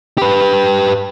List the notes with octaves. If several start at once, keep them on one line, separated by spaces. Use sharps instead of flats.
G4 B4